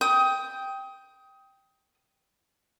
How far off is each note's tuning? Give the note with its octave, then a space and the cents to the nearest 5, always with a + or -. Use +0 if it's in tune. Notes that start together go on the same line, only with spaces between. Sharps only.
G5 +0 D#6 +20